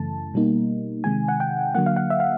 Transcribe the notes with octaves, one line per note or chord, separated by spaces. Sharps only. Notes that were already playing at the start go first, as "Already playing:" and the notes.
Already playing: F#2 C#3 E3 A3 A5
B2 G3 A#3 D#4
C3 D#3 G#3 G#5
F#5
G5
D3 F#3 A#3 F#5
F5
F#5
E5
F5